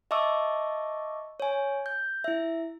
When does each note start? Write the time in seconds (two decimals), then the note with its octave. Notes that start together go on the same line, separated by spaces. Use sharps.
0.11 D#5 E5 A5 C#6 D6 E6
1.40 C#5 G#5
1.86 G6
2.24 E4 E5